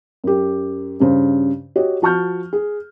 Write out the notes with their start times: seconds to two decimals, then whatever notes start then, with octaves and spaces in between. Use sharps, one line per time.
0.24 F#2 G4
1.00 G2 C#3 C5
1.76 F#4 G4 C#5 D#5
2.02 F3 F#4 A5 C#6 F6 G6
2.53 G#4